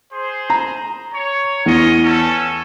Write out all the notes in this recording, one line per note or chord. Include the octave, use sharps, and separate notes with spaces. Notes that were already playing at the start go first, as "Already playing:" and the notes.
G#4 C5
A#5
C#5
E2 F4 C#5 D#5
A3 C#4 A4